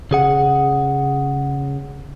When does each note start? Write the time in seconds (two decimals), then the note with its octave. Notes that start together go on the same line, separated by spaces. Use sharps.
0.11 C#3 G#4 F#5